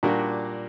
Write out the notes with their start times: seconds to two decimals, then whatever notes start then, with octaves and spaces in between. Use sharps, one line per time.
0.03 A#2 G3 A#3 D4 F#4